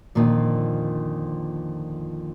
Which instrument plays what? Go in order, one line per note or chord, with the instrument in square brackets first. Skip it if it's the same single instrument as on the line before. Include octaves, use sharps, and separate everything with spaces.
[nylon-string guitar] F2 A#2 D3 D#3 F3